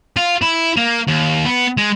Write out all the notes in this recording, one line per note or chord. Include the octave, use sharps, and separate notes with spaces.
F4
E4
A#3
D#2
B3
G#3